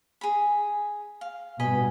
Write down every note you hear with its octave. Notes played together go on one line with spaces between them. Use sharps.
G#4 B5
F5
G2 B2 D#5 G#5 B5